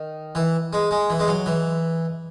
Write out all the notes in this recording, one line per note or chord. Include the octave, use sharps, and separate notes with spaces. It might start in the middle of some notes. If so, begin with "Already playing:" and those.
Already playing: D#3
E3
G#3
G#3
E3
G#3
F#3
E3